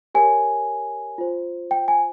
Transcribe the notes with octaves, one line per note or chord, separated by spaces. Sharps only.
G4 A#4 C#5 G#5
F4 C5
G5
G#5